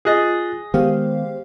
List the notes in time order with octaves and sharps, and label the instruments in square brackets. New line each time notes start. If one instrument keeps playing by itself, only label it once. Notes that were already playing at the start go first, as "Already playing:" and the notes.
[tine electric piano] F4 F#6 A6 [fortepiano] G#4 D#5
[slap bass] D#3 B3 [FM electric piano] G#3 G4 F5 [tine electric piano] C5